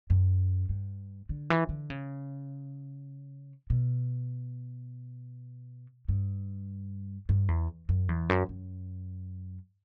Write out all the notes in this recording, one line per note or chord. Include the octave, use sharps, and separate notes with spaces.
F#2
G2
D3
E3
D3
C#3
B2
G2
G2
E2
F#2
E2
F#2
F#2